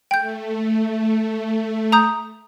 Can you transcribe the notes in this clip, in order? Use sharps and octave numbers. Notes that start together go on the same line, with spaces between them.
A3 G5 G6
A#5 D#6 G6